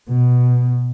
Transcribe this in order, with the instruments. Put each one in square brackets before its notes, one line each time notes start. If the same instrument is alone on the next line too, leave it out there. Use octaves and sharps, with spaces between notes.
[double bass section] B2